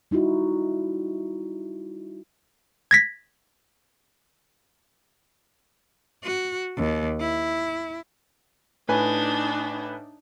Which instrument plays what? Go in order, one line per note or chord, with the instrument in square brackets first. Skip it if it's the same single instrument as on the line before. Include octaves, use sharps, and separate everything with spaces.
[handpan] G3 D#4 E4 F#4
[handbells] G#6 A#6 B6
[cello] F#4
D#2
E4
[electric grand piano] A2 B4 G#5 [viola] D4 D#4